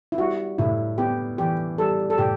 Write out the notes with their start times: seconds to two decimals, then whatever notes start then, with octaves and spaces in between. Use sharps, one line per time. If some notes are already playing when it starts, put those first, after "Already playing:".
0.12 E4
0.18 G3 F#4
0.58 A2 E4
0.98 B3 G4
1.38 E3 G4
1.78 G3 A4
2.10 A4
2.18 A2 G4